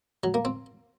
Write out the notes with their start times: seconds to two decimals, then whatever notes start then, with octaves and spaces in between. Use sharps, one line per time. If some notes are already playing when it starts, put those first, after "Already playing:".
0.24 F#3
0.34 A#3
0.45 C4